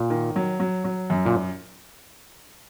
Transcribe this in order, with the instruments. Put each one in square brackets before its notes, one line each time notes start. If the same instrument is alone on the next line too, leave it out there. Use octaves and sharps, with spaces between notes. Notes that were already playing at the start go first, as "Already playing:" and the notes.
Already playing: [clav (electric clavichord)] A#2
[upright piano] D#3
F#3
F#3
F#3
F#2
[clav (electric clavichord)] A#2